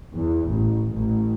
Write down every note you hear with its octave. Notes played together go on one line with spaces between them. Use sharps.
E2
A1
A1